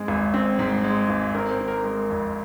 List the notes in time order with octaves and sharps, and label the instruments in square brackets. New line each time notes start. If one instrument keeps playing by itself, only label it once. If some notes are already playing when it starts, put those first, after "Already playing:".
Already playing: [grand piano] G#2 G#3 C4
G#1
C4
G#2
G#3
G#1
C4 A#4
C5
D#3
A#4
G#3 A#4
F2